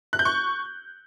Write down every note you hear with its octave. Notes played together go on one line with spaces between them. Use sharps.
F#6
G6
C#6